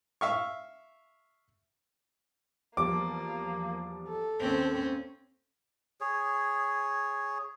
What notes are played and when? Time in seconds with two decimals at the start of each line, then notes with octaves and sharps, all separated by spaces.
0.21 E5 F5 C#6
2.77 E2 F3 G3 A#3 D6
4.09 A4
4.40 D#2 A#3 C4 C#4 C5
6.01 G#4 C#5